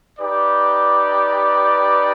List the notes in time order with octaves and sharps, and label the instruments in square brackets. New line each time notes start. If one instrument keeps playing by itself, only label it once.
[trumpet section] D#4 G4 B4 D5